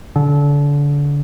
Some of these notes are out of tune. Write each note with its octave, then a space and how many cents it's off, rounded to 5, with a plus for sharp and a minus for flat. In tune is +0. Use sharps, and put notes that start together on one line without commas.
D3 -30